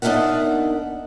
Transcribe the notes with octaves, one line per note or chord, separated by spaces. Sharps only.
B3 D4 D#4 A#4 E5 F#5